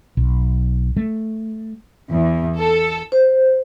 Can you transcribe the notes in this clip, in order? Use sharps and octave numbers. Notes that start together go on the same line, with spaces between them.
B1
A3
E2
A4
C5